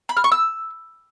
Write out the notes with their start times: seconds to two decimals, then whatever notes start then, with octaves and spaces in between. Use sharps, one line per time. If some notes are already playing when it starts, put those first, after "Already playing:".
0.09 B5
0.17 F6
0.24 C#6
0.32 E6